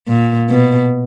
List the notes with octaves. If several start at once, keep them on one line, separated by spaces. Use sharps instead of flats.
A#2
B2